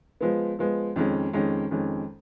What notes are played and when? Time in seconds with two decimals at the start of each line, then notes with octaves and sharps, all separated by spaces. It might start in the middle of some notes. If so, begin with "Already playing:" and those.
0.21 F3 G#3 B3
0.59 F3 G#3 B3
0.96 F2 D#3 G#3 C#4
1.33 F2 D#3 G#3 C#4
1.71 F2 D#3 G#3 C#4